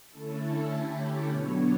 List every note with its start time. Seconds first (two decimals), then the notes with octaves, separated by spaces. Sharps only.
0.11 D3 A3 C#4 E4 A4
0.70 D3 A3 C#4 E4 G4
1.01 A4
1.30 B2 F#3 B3 D4 C#5